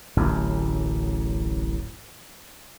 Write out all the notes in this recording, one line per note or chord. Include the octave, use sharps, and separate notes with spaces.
D1 A1 F#2